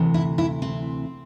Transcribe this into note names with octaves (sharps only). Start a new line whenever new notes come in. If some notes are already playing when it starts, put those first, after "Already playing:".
Already playing: D2 C3 E3
E4
E4
C4